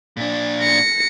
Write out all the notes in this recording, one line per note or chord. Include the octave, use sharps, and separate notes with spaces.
A#2 D4
A#6 C#7